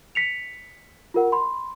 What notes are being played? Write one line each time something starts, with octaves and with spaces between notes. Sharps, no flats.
B6 C#7 F7
F4 G4 A#4 F#5
B5 C6